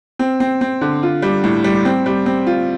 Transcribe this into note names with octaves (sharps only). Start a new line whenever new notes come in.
C4
C4
C4
D3
F4
G3
A2
G3
C4
G3
C4
F4